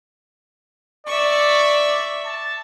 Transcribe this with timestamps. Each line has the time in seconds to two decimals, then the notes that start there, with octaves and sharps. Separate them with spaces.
1.07 D5 E5 C#6
2.26 A5